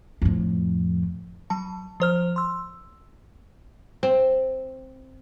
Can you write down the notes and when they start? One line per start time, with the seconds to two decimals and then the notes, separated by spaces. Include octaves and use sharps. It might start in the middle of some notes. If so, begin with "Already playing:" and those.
0.22 F2 A2
1.50 F#3 A5
2.00 F3 C5 F6
2.36 C6 E6
4.03 C4